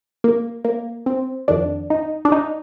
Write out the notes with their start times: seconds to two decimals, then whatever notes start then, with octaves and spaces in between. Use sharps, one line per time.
0.24 A#3
0.65 A#3
1.06 C4
1.48 F2 D#3 D4
1.90 D#4
2.25 D4
2.32 D#4